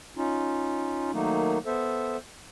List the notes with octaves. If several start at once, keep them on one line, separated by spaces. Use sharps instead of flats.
C#4 D#4 F4
D#3 F#3 A3 A#3 D#4
B3 A4 C5 E5